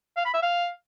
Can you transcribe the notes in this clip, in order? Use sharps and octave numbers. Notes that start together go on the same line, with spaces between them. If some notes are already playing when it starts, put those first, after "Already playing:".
F5
B5
E5
F5